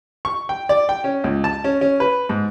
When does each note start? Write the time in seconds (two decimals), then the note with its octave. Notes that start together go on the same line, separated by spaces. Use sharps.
0.25 C#6
0.49 G5
0.69 D5
0.89 G5
1.04 C#4
1.24 C#2
1.44 A5
1.64 C#4
1.81 C#4
2.00 B4
2.29 G#2